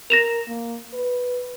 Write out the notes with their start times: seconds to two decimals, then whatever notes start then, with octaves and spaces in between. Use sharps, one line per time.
0.10 A#4 A#6 E7 F7
0.48 A#3
0.94 B4